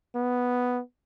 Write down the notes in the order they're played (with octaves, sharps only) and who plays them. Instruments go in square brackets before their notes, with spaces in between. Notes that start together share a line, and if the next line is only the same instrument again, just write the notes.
[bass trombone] B3